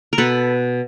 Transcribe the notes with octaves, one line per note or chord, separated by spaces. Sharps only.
A#4
B2 A4 B4